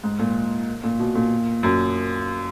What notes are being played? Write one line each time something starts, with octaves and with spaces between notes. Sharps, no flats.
G#2
A#2
A#2
B2
A#2
F#2